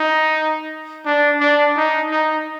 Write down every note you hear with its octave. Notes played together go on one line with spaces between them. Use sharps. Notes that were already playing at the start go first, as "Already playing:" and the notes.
Already playing: D#4
D4
D4
D#4
D#4